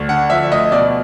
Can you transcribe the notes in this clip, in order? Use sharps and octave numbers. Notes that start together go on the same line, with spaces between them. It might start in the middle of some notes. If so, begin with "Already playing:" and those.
Already playing: D2
D3 F#5
F3 E5
D2 D#5
B2 D5